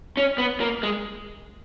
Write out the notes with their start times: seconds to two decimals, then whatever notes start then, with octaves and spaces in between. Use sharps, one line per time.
0.17 C#4
0.38 B3
0.60 A#3
0.83 G#3